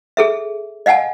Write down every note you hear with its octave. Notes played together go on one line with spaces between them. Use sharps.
G#4 A4 E5
D#5 F5 F#5 G#5 A5